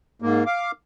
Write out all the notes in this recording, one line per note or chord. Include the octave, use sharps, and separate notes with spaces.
G#2 A#3
F5 D6